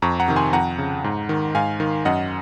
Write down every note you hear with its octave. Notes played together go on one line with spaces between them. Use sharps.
F2 A#5 C#6
F#5 A#5
C3 D#3
G#5 C6
F2 F#5 A#5
C#3
G#2
D#3
G#2 F5 G#5
D#3
F#2 D#5 F#5